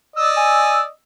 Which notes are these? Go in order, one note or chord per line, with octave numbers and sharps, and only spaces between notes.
D5 D#5 E6
G#5